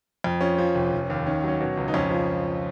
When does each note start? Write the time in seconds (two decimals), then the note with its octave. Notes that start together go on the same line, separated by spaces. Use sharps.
0.24 F2
0.41 F3 C#4
0.58 F3
0.75 F1
0.92 F1
1.10 D#2
1.26 D#3 C#4
1.44 F#3 C#4
1.61 B2
1.77 C#2
1.88 D#4
1.94 F2 C#4
2.11 F3